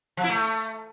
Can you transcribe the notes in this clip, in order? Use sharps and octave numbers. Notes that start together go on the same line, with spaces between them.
F3
E4
A3